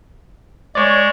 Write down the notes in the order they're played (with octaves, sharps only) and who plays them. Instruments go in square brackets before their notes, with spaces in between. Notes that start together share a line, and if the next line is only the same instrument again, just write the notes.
[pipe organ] G#3 [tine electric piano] C#5 D5